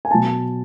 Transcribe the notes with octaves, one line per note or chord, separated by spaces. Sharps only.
G#5
B2 F#3 A5